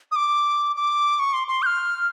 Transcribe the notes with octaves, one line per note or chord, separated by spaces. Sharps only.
D#6
D6
D6
C#6
C6
C6
G6
F6